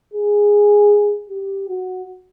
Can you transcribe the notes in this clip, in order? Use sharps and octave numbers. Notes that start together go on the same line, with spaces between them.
G#4
G4
F#4